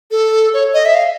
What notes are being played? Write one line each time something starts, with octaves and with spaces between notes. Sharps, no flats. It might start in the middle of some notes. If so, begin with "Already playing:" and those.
A4
C#5
D#5
E5
F5